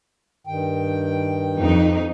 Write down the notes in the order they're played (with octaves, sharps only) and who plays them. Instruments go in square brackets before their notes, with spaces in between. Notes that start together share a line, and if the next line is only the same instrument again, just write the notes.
[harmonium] G2 D#3 G5
[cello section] F2 D#4